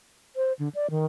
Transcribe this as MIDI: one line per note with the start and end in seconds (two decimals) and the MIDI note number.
0.36 0.53 72
0.59 0.69 50
0.75 0.90 74
0.90 1.06 51